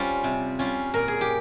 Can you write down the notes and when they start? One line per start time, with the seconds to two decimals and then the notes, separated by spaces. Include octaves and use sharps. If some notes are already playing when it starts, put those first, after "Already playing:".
Already playing: G3 C#4 F4 C5
0.24 C3
0.59 G3 C#4 F4
0.94 A#2 A#4
1.08 G#4
1.21 G4